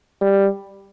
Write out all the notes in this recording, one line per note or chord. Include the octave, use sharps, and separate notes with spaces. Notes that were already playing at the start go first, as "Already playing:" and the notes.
G3